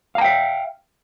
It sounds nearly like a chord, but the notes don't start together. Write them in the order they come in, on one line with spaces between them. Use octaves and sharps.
F5 A#5 G5 E5